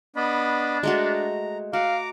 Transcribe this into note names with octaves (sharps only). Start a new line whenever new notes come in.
B3 D4 D#5 B5
G#3 A3 F#4 A#5
F#4 F5 A#5 D6